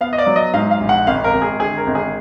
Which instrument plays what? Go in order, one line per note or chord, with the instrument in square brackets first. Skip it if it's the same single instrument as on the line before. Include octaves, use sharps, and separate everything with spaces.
[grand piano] B3 F5
D#5
D5
F#3
D#5
G#2 F5
F5
A#1
F#5
G#1 F5
A#4
G#1
G#4
D3 G#4
A#4
G#1
G#4